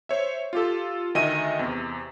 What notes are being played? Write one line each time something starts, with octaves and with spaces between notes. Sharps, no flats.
C5 C#5 E5
F4 G4 A4
D2 D#3 D#5 E5 G#5 D#7
E2 C3